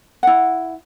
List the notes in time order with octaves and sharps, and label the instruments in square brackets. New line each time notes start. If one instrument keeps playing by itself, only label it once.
[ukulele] E4 F#5